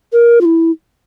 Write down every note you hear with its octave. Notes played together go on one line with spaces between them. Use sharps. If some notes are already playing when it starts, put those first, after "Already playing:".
A#4
F4
E4